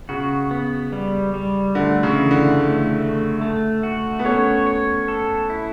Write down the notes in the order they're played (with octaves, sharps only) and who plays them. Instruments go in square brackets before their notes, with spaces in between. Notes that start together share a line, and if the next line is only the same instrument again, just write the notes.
[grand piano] C#3 [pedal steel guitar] F#4
[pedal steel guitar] B3
G3
G3
[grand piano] D3 [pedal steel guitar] A3
[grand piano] C#3
[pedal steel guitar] E3
[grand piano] D3
[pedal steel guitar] A3
A3
A3
F#4
[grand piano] B3
[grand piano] A3 C#4 [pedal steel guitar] C#5
[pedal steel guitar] C#5
A4
E4